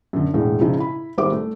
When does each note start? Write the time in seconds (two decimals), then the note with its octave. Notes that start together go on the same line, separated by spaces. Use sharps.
0.13 F#2 D3
0.34 E1 A2
0.61 C#3 F3 D#4 E4
0.77 E4 B5
1.18 G#1 G3 C5 E5 D6
1.32 A3